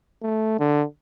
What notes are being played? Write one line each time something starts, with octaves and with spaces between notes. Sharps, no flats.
A3
D3